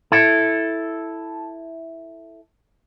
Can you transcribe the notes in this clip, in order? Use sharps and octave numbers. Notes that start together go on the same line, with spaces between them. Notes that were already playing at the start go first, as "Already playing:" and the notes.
E4 A4